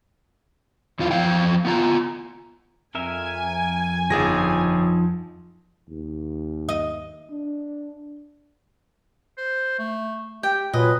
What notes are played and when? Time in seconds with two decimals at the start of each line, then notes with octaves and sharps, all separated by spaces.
0.99 E2 E3 F4
1.11 E2 E3 F3 F5 G5
1.65 B3 F4 A#5
2.95 F2 A#4 E5 G#5
4.10 G1 F3 D#4 G#4 A#6
5.89 D#2
6.69 D#5
7.30 D4
9.38 C5
9.79 A3
10.43 G4 G5
10.73 A#2 F#3 F4 B4 D#5 G#5